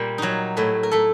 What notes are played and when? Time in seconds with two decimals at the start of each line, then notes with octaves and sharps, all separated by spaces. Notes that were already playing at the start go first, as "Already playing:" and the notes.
Already playing: A#2 G3 A#3
0.18 F#3 D#4 F#4
0.57 A2 F#3 A3
0.83 A#4
0.91 A3 A4